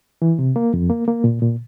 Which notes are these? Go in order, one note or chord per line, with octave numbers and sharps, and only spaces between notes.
E3
C3
A#3
F2
A#3
A#3
A#2
A#2